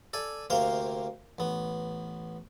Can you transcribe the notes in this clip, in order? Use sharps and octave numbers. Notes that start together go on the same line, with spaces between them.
A4 D5 G#5
D2 C3 A#3 C5 F5 G5
A1 B3